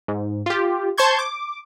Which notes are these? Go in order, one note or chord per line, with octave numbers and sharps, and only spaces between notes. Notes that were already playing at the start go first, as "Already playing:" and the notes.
G#2
F4 G4
C5 A5 C6 C#6 G6 G#6
D6